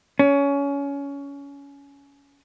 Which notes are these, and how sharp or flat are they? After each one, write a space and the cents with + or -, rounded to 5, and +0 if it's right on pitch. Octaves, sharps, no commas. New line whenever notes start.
C#4 +20